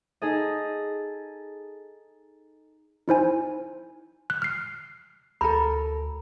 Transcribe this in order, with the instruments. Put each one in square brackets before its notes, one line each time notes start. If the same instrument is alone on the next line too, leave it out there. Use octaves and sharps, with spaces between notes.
[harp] D#4 G#4 A4 D#5
[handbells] D#4 E4 C5 G#5
F#6
F6 C7
[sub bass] D2 [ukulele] A4 A#4 [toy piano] B5